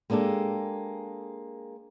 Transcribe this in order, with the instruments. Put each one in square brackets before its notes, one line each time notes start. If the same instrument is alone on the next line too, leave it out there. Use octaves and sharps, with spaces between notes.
[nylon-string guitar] G#3 A#3 D4 G4 A4